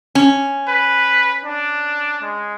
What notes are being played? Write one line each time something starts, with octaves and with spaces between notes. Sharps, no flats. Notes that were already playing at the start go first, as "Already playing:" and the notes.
C#4
B4
D4
G#3